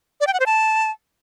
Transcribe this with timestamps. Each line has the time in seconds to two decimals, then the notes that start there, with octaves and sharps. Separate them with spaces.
0.21 D5
0.27 G5
0.33 F#5
0.40 C5
0.46 A5